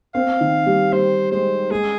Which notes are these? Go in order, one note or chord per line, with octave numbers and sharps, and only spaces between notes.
C4 F5
D#3
G3
G3 C5
G#3 C5
G#3 G#4